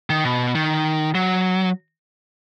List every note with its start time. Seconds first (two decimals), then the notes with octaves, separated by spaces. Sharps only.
0.10 D#3
0.25 B2
0.55 D#3
1.15 F#3